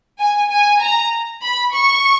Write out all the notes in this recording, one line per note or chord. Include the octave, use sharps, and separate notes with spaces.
G#5
G#5
A#5
B5
C#6